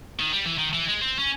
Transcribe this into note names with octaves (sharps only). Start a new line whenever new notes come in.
D#3
G3
E3
D#3
E3
G#3
C4
C#4